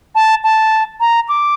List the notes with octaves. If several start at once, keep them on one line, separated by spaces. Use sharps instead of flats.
A5
A5
A#5
D6